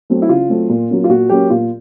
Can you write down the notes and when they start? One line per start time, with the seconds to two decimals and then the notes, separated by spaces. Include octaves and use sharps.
0.10 F#3 A3 C4
0.22 E4
0.29 C#3 F4
0.49 F#3 A3 C4
0.69 A#2
0.90 F#3 A#3 C#4
1.04 F4
1.09 A#2 F#4
1.29 F#3 A#3 C#4 G4
1.50 A#2 F4